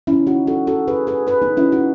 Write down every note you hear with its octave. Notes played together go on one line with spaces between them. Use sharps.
C#4 E4
D#4 F#4
F#4 A4
F#4 A4
G#4 B4
G#4 B4
G#4 B4
B3 D#4
C#4 E4
D#4 F#4